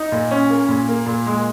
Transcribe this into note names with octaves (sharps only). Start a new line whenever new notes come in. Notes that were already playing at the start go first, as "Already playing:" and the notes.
Already playing: D#4
A#2
C#4
A#3
A#2
A#3
A#2
G#3